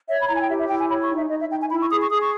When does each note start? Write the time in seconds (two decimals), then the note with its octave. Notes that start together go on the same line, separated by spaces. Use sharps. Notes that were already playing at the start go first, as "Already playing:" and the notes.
0.08 C#5 E5
0.21 B5
0.28 E4 A#5
0.35 G#5
0.42 G5
0.49 G4 E5
0.59 E5
0.69 E4 G5
0.79 G#5
0.89 C#5 B5
1.03 C#6
1.09 D#4
1.16 E5
1.30 D#4 D#5
1.40 E5
1.50 D#4 G5
1.60 G#5
1.71 E4 B5
1.80 C#6
1.91 G#4 D#6
2.01 C#6
2.11 G#4 D#6
2.21 C#6